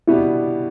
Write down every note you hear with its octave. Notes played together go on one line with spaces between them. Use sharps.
B2 G3 B3 D4 E4